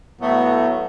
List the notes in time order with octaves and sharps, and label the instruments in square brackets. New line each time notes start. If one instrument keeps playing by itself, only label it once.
[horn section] A2 F#3 A3 [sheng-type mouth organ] B3